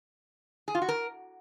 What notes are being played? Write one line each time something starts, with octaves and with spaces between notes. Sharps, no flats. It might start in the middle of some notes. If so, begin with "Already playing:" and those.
G#4
F4
F#4
A#4